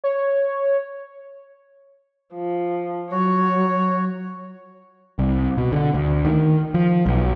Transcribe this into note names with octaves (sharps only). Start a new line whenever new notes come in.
C#5
F3
F#3 F#4 C#5
C2
B2
D3
D2
D#3
F3
B1